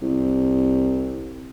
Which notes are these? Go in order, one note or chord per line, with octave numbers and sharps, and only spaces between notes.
C2